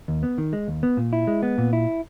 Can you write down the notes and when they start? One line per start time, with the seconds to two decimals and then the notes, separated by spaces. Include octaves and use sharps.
0.08 D#2
0.23 B3
0.38 D#3
0.53 G#3
0.68 D#2
0.83 B3
0.97 A#2
1.13 E4
1.27 G#3
1.43 B3
1.58 A#2
1.73 E4